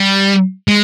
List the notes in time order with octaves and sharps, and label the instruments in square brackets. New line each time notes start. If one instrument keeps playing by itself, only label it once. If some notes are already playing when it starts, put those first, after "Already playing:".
Already playing: [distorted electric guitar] G3
G#3